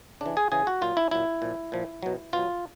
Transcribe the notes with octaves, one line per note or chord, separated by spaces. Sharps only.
C#3 E3 D4
G#4
C#3 E3 G#4
F#4
A#2 F#3 F4
E4
A#2 F#3 E4
A#2 F3
A#2 F3
B2 F#3
B2 F#3 F4